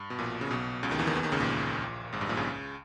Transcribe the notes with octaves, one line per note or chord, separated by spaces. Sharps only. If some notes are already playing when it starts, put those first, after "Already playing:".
Already playing: G2
B2
A#1 A#2
C#3
B1 B2
C#2 C#3
D#2 D#3
E2 E3
D#2 D#3
E2 E3
D#2 D#3
C#2 C#3
A#1 A#2
G#1 G#2
G2
A#1 A#2
C#2 C#3